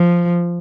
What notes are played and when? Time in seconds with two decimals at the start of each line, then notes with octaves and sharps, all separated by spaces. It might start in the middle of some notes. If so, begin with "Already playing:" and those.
Already playing: F3